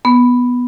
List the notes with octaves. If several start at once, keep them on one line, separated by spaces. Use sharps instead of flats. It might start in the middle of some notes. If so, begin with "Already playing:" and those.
B3